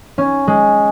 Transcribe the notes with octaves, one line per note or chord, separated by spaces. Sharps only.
C#4
G#3